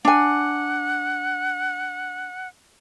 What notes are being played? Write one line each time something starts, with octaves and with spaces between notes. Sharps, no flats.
D4 F#5 G#5